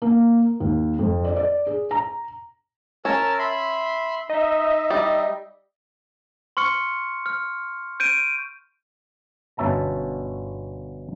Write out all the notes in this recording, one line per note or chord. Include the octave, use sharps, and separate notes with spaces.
A#3
D#2
F2
D5
D5
G#4
A#5
C#4 A#4 A5 E6
E5 B5 C6
D#4 D#5 E5
G3
C6 C#6 F6 C#7
F6
G6 D7 D#7
G1 B2 C#4 E5 A5 A#5